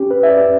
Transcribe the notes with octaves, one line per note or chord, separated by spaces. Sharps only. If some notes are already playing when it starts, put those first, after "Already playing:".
Already playing: C#4 G4
B4
E5
D5